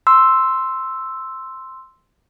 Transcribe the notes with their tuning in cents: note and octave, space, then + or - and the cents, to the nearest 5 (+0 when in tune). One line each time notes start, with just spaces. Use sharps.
C6 +0 E6 +0